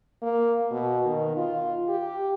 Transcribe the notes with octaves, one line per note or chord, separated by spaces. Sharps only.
A#3
B2
D#3
F4
G4